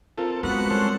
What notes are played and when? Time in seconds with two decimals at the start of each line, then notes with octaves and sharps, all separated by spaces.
0.18 C4 F4 A4 A#4
0.43 G#3 B3 F#4 A#4 F#5
0.70 G3 C#4 A4 C5